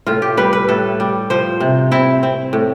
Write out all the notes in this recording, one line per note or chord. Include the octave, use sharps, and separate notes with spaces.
A2 F4
G4
G3 B4
B4
A2 A4
G3
F3 C5
C3
C4 E4
C4
A2